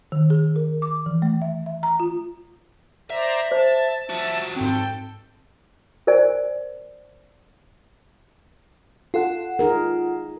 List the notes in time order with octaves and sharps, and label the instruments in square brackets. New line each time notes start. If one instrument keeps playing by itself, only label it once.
[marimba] D#3
G#4
A#4
D6
E3
A3
E5
E5
A#5
F4
[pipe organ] C5 D5 A#5 [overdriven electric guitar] E5
[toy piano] C5 [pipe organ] A5
[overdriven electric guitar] F3 F#4 [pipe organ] E5 A5
[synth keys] G#2 C4 [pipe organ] A4 G5
[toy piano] A#4 C5 D5 G#5
[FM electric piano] F4 A4 F#5
[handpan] D#4 G#4 A#4